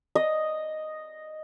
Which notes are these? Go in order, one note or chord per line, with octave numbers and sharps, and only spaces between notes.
D#5